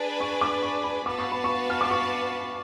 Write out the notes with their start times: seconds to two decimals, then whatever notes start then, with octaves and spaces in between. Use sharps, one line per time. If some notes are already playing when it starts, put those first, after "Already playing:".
Already playing: D4 G#4 B4
0.20 C#6
0.41 D6
0.63 C#6
0.84 B5
1.06 B3 F#4 B4 F5 A5 D6
1.19 C#6
1.32 B5
1.44 C#6
1.70 F6
1.81 D6
1.91 C#6